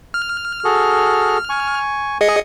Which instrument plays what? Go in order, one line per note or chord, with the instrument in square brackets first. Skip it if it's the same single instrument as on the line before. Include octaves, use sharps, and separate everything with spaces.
[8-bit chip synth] F6
[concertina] F#4 G#4 A4
G#5 C#6
[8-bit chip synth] G#4 D#5 C#7